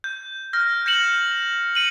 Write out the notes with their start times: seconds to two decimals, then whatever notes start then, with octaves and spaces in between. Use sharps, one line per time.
0.04 G6
0.53 F6 G6 A#6
0.86 G6 A#6 C#7 E7 F#7
1.75 C#7 D#7 F#7